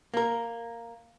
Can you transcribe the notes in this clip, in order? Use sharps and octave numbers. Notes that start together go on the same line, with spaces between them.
A#3 A#4